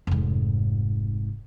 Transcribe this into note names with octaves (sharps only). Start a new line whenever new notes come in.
F1 G#2